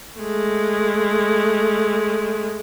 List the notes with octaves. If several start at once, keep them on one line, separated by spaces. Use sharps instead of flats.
G#3 A3